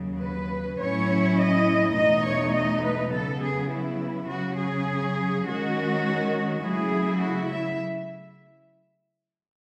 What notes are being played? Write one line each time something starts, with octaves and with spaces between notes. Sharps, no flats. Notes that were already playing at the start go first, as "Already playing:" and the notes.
Already playing: D#2 C#3 F#3
B4
A2 F#3 C#4 E4 C#5
D#5
E2 B2 A3 D#4 D#5
C#5
D#5
B4
C#3 F#3 B3 A4
G#4
E4
C#3 F#3 C#4 F#4
G#4
D#3 G#3 C#4 F#4
C#3 F#3 A3 E4 G#4
F#4
E5